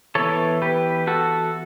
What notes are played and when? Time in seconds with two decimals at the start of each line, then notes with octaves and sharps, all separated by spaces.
0.15 E3 B3 A4 C#5
0.62 G4 B4
1.07 F#4 A4